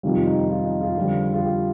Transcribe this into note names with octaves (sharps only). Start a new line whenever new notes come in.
F2 C3 D#3 G3 F4
D#4
F4
D#4
F4
F2 D3 G3
F4
G4